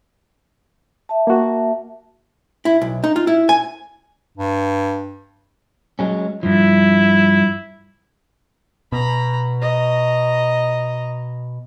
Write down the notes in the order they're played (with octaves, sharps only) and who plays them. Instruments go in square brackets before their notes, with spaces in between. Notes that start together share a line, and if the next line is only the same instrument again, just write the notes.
[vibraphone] E5 A5
[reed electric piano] A#3 F#4
[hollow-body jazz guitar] E4
B1
D#4
F4
E4
G#5
[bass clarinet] G2
[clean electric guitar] F#3 G#3 C#4
[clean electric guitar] G2 F3 [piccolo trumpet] E4
[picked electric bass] B2 [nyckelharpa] A#5 B5
[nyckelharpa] D#5 A#5